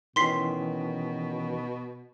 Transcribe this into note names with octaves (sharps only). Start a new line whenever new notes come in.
B2 D#3 E3 C#4 C6 B6 C7